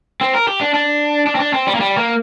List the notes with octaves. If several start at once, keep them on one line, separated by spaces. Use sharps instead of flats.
C4
A#4
G4
D4
D4
D4
C4
D4
C4
G3
A#3
G3
A#3